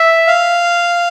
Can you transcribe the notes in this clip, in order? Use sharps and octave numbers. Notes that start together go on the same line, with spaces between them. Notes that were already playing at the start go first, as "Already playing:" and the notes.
Already playing: E5
F5